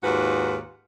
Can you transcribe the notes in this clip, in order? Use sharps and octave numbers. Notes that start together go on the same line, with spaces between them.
D#2 G#2 F4 F#4 B4